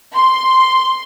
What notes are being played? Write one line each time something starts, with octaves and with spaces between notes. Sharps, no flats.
C6